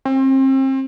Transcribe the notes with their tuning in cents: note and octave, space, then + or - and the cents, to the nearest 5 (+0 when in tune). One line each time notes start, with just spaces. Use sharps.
C4 +35